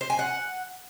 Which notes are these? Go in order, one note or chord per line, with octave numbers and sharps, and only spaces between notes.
C5
G#5
F#5